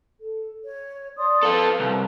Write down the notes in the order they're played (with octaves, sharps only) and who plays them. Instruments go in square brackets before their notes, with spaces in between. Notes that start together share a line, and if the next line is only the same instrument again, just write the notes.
[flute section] A4
C#5
D5 C6 D#6
[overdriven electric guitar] F4 A4 [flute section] B4
[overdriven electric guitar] C2